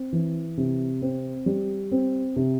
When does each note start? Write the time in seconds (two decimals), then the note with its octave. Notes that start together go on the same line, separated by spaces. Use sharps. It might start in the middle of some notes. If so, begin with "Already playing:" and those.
Already playing: C4
0.12 E3
0.57 C3
1.02 C4
1.46 G3
1.91 C4
2.36 C3